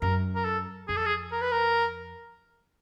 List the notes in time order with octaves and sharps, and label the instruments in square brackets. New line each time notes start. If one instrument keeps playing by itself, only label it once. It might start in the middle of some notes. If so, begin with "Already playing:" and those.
[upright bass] F#2 [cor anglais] A#4
[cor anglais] A#4
A4
[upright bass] F2 [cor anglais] G#4
[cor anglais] A4
G#4
A#4
B4
A#4